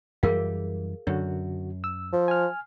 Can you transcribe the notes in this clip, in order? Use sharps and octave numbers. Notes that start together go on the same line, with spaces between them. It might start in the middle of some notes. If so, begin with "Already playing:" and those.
F#2 E3 G3 G#4 A#4 F5
F#2 D3 F#4 C#5
E6
F3
G#5 F6